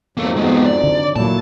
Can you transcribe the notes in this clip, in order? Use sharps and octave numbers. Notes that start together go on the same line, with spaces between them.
F2 G#2 F#3 A#3 A4
G#3 B3
D5
D3
A#2 F#3 A#3 E4 A4 A5